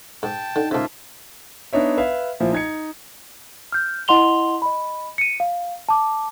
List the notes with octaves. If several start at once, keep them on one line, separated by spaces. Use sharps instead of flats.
G#2 G5 A5
D3 D#4
G#2 C#3 A#3 F4 C5 E5 A5
B3 D4 D#4 C#5 E5
B4 E5 F5
A#2 F3 E4
D#4 G#6 C#7
F6 G6
E4 D#5 F#5 C6 F7 G7
D#5 B5
C#7 D#7
F5
A5 D6